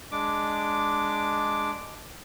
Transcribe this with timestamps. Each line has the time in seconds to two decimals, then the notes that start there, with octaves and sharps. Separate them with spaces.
0.12 G#3 D4 D6